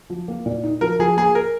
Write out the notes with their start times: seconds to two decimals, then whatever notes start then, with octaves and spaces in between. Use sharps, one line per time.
0.10 F3
0.28 A#3
0.46 A#2
0.64 D#4
0.81 F3 A#4
0.99 F3 G#4
1.17 A#3 G#4
1.35 A#4